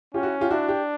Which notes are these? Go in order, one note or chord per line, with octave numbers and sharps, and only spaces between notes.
C#4 F4 G4
E4 F#4
F4 G4
D4 E4 F#4
G4